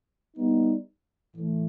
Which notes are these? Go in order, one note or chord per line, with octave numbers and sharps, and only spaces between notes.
G3 B3 D#4
A2 E3 A3